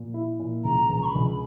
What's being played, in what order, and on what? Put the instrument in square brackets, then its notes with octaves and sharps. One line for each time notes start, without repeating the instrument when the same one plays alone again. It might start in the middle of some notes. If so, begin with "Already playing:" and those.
Already playing: [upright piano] A#2
E4
A#2
[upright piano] C#2 [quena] A#5
[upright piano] C#2
[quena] C#6
B5
[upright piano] C#2